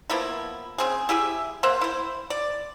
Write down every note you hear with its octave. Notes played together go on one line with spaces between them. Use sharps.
F3 A#3 B3 E4
C#3 C4 G#4
E4 G4 G#4 E5
A#3 C5 E5 F#5
E4 C5
D5